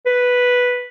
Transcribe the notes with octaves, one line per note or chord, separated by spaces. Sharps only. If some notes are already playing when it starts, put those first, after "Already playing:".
B4